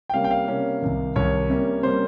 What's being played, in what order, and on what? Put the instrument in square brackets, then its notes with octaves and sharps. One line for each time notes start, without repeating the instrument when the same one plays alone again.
[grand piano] G5
C3 G3 A#3 C#4 F5
G5
F5
C3 G3 A#3 C#4
C2 C3 D#3
C2 C3 D#3 C#5
C3 G3 A#3 C#4
C3 G3 A#3 C#4 C5